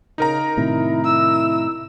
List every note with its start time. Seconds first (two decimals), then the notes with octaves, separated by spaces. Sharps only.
0.18 C#3 D#4 A#4 A#5
0.57 A2 C3 D#3 E4
1.05 E4 E6